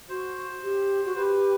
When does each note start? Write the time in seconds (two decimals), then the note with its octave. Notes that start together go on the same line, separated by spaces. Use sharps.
0.09 F#4 C5
0.63 G4
1.05 F#4
1.16 G4 B4